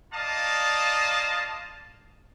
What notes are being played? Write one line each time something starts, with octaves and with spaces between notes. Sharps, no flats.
A#3 F4 D5 D#5 F5 A5